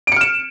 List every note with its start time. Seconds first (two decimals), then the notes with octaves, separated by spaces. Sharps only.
0.07 D7
0.12 C#7
0.16 F6
0.21 E7